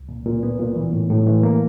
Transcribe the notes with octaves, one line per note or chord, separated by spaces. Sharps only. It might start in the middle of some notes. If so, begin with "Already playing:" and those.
Already playing: C#2
A#2
A#2
B3
A#2
E3
A2
A2
E3
A#3